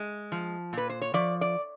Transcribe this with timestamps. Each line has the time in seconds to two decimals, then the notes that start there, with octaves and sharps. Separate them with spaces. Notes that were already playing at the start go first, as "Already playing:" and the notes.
Already playing: G#3
0.32 F3
0.73 A#2 B4
0.89 C5
1.02 C#5
1.14 F3 D5
1.41 D5